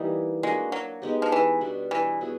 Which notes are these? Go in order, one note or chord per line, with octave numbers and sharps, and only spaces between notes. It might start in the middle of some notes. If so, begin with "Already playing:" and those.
Already playing: E3 G3 A#3 D#4
G#3 A#3 D4 F#4
F#3
G#3 B3 D#4 G4
F3
E3
B2 G3 B3 D4
E3
F#3 B3 E4 G#4